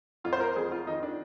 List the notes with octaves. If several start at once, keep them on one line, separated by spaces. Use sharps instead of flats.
F2 F4
C5
A#4
F2 G#4
F4
D#3 D#4
D4